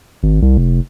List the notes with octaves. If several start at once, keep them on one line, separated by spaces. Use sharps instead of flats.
G#1
C2
F1